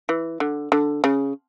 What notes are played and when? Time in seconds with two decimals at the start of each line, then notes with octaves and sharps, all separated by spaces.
0.09 E3
0.40 D3
0.72 D3
1.04 C#3